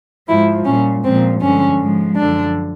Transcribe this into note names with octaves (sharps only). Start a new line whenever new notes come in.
G#2 F3 G#3 E4
A#2 G3 C#4
A#2 F3 G#3 C4
G2 D3 F3 G#3 C#4
G#2 F3 G#3
F#2 D3 F3 D4